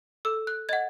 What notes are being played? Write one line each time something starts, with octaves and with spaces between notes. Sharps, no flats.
A4 E6
F#6
D#5 F#5 G#6